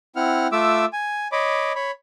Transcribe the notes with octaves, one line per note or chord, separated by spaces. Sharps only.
C4 E4 F#5 F6
A3 F4 E5 D6 E6
G#5
C#5 D#5 B5 D6
C#5 B5